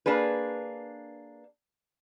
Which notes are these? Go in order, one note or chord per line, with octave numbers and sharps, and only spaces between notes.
A#3 D4 G#4 B4